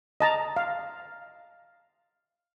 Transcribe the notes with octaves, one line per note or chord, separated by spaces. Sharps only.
D#5 A5 A#5
F5